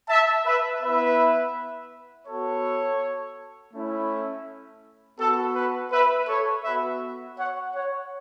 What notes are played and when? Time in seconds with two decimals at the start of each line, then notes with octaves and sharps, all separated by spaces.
0.09 E5 A5
0.46 B4 E5
0.82 B3 E4 B4 E5
2.28 B3 F#4 A4 C#5
3.74 A3 C#4 E4
5.19 B3 F#4 A4
5.56 B4
5.91 B4 E5
6.28 A4 C#5
6.64 B3 F#4 B4 E5
7.38 C#5 F#5
7.74 C#5 F#5